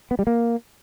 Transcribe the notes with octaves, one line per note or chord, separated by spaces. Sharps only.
B3
G3
A#3